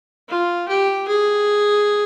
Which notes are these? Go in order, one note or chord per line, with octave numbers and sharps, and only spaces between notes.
F4
G4
G#4